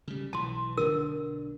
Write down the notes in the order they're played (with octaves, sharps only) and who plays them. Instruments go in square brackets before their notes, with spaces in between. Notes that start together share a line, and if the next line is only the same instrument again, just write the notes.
[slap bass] C#3 G3
[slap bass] B1 E3 [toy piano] A5 C6
[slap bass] B1 D3 D4 [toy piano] A#4 E6